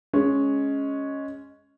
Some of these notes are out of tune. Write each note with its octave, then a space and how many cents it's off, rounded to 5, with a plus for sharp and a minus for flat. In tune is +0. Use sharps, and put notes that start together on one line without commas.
G#3 +5 C#4 +0